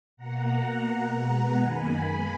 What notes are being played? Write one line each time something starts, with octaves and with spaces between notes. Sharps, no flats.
B2 A#3 F#5 A#5
B2 A#3
B2 G#3 B3 F#5 A#5
F#2 D#3 A#3 G#5 B5
G#3 B3